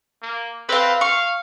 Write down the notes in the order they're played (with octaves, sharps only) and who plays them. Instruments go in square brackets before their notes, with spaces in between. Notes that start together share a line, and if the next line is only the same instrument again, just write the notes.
[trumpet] A#3
[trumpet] C4 [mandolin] B4 F5
[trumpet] F5 [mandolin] C#6